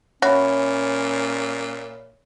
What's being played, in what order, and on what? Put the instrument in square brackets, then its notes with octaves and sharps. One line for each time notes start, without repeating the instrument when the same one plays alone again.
[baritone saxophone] A#2 [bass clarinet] C#4 [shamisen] F#4 [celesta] C#5 E5 B5